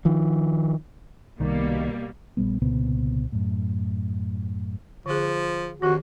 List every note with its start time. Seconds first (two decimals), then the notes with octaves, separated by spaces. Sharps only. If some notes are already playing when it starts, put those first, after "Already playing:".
0.05 D#3 F3
1.40 C2 B2 D#3 G3 A#3
2.37 A#1 G3 B3
2.61 C2 A#2 C#3 B3
3.32 F#2 A2
5.06 D3 F3 G#4
5.82 F2 D#3 F#4 G4